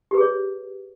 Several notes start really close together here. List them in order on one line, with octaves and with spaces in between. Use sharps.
G4 B4 G#4 C#5